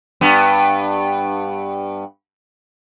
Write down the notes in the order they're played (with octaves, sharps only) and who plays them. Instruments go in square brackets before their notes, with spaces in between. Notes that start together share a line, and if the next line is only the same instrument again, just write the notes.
[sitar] G2 B3